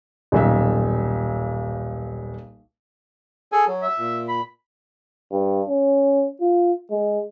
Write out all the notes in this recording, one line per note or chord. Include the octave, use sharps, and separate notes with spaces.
D#1 B1 E5
G#4 A4 G#5
F#3
E5
A#2
B5
G2
C#4
F4
G#3